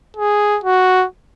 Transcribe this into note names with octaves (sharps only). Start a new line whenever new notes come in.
G#4
F#4